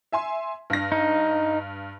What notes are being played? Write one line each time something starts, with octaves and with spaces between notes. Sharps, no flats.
E5 G#5 C6
G2 A#6
D#4